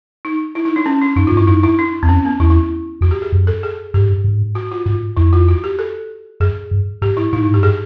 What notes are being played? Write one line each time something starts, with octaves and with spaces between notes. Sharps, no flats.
D#4
E4
D#4
D4
C#4
D4
F#2 D#4
G#2 F4
G2 E4
F#2 D#4
E4
D4
E2 C4
F2 C#4
B3
E2 E4
E4
F2 F#4
G4
G#4
F#2
A4
G#4
G2 G4
G#2
G2
G#2
F#4
F4
G#2 F4
F2 E4
F4
F#4
G4
A4
F#2 G#4
G2
G#2 G4
E4
A2 D#4
G#2 D#4
G2 G4
G#4